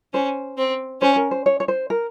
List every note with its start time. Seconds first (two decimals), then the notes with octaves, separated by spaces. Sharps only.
0.13 C#4 C5
0.58 C4
1.01 C#4 C5
1.16 A#4
1.31 C5
1.46 C#5
1.60 C#5
1.68 C5
1.90 A#4